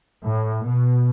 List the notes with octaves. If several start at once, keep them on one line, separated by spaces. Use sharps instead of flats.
A2
B2